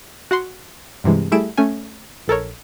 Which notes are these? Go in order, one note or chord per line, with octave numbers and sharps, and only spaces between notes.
F#4 F#5 C6
G2 C3 E3 G#3
G3 A3 E4 G#4 D7 E7
A3 C#4 G#5
A#1 A4 A#4 C#5